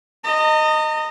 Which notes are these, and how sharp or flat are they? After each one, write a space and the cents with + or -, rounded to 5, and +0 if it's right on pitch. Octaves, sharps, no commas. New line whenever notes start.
D#5 -10 A#5 -40